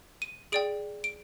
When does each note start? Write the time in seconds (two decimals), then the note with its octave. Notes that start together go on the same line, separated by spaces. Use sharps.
0.22 D#7
0.52 G#4 D5 G5 D7
1.04 D7